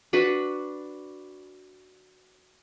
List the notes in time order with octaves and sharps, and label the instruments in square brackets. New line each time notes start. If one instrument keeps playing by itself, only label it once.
[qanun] D4 F#4 B4 B5